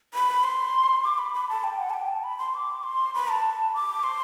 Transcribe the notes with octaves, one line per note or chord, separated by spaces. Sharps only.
B5
C6
D6
B5
B5
A5
G5
F#5
A5
G5
A5
B5
C6
D6
C6
B5
A5
D6
C6